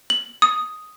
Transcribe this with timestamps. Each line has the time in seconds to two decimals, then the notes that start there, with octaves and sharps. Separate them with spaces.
0.10 F#7
0.42 D#6